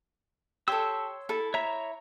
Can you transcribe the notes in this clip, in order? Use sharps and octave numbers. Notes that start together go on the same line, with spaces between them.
G4 A4 C#5 C6 E6
E4 A4
C#5 E5 A#5